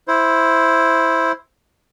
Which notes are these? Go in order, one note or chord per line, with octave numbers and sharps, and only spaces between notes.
E4 C5